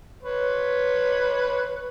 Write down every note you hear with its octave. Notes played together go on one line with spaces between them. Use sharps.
B4 C#5